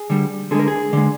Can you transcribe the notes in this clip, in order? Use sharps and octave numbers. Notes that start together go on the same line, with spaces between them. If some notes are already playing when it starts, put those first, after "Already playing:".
Already playing: G#4
D3 G3
D3 G#3 G#4 A#4
G#4
D3 G#3